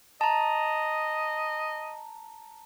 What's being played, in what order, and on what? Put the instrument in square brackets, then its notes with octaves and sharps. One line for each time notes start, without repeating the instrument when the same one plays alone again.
[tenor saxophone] D#5 [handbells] A5 A#5